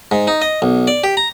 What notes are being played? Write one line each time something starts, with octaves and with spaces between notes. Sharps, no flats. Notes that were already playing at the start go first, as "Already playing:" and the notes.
G#2
D#4
D#5
B1
D5
G4
A#5